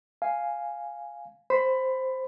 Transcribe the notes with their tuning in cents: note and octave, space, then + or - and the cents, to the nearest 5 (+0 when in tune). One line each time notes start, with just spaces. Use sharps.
F5 +0 G#5 +0
C5 +0 B5 +15